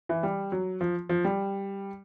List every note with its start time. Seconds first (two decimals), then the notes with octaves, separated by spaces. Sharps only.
0.09 E3
0.23 G3
0.52 F#3
0.81 F3
1.09 F3
1.25 G3